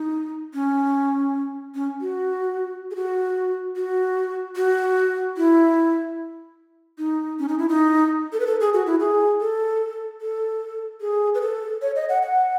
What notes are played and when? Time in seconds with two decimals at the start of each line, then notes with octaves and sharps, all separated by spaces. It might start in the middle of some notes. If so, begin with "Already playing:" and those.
Already playing: D#4
0.54 C#4
1.75 C#4
2.01 F#4
2.91 G#4
2.96 F#4
3.76 F#4
4.56 F#4
5.37 E4
6.98 D#4
7.39 C#4
7.48 D#4
7.59 E4
7.69 D#4
8.33 A4
8.40 B4
8.46 A4
8.60 G#4
8.73 F#4
8.86 E4
9.00 G#4
9.41 A4
10.21 A4
11.01 G#4
11.34 B4
11.41 A4
11.82 C#5
11.96 D#5
12.09 F#5
12.23 F#5